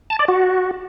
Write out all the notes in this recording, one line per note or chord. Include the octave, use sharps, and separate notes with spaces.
A5
D5
F#4